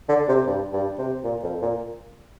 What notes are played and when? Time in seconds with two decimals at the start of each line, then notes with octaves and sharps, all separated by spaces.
0.09 D3
0.28 C3
0.47 G2
0.73 G2
0.98 C3
1.24 A#2
1.43 F2
1.62 A#2